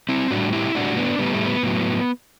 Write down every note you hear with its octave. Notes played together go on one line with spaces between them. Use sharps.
C4 E4
A2 E3 D4 F#4
G3
E4 G4
A2 G3 D4 F#4
B3 D4
A2 G3 B3
A3
B3
A2 F#3